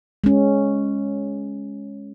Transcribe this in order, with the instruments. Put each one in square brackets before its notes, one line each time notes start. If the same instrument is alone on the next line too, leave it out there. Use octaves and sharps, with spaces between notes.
[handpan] G#3 C#4